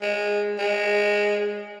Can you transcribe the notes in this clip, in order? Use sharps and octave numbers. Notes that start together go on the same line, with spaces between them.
G#3
G#3